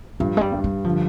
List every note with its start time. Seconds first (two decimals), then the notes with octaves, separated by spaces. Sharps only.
0.20 G2 F3
0.37 G#3
0.41 G3
0.52 G2
0.64 G3
0.84 D3 F3